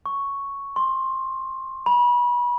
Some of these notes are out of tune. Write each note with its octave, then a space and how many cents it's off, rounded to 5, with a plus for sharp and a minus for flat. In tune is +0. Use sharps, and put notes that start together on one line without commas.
C#6 +0
C6 +15
B5 -30